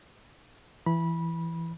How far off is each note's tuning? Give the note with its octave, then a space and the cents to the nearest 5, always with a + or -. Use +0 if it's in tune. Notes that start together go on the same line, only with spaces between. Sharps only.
E3 +15 B5 -20